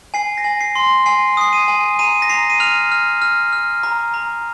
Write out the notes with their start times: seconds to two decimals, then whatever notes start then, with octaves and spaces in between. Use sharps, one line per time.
0.14 G#5 C7
0.38 A#6
0.44 G#5
0.61 C7
0.75 C6
1.06 G#5 C7
1.37 D#6 C7
1.53 D#7
1.68 G#5
1.99 A#5 D#7
2.22 A#6
2.29 A#5 C7
2.50 D#7
2.60 F6 F7
2.91 F6
3.22 F6
3.53 F6
3.83 A#5
4.14 A#5